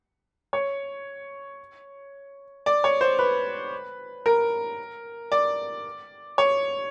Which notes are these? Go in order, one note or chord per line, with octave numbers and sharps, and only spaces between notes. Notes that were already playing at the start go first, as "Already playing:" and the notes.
C#5
D5
C#5
C5
B4
A#4
D5
C#5